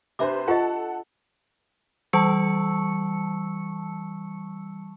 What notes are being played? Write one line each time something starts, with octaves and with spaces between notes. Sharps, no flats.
C3 D4 B4 C5 E5 D6
F4 G4 A4 D#5 F#5 A5
E3 G3 A5 C#6 E6 C#7